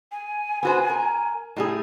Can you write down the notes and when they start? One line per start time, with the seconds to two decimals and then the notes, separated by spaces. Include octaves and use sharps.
0.12 G#5
0.63 B3 F#4 C5
0.90 A#4
1.57 A2 G3 G#4